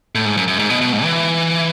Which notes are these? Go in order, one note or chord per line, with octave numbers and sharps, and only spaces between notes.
A2
G#2
F#2
F#2
G#2
B2
B2
G#2
E3